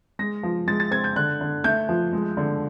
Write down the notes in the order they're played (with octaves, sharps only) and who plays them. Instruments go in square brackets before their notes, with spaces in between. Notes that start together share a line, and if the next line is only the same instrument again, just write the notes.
[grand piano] G#3 [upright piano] A#6
[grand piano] F3
[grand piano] G#3 [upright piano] A6
[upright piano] A6
[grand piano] C4 [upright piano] G#6
[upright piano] G6
[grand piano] D3 [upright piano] F#6
[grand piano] D3
[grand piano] A3 [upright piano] G6
[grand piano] F3
G#3
D3